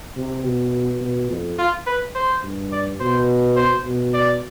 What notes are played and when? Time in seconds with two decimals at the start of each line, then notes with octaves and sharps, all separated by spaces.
0.17 C3
0.44 B2
1.01 B2
1.30 F2
1.58 F4
1.86 B4
2.15 C5
2.43 G2
2.72 D5
3.00 B2 C5
3.56 C5
3.85 B2
4.14 D5